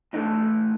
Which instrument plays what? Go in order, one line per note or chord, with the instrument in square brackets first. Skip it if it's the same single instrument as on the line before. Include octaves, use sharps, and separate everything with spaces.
[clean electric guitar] A2 E3 A3 D4 D#4